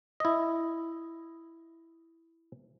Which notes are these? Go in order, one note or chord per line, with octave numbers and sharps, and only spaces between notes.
E4 D#5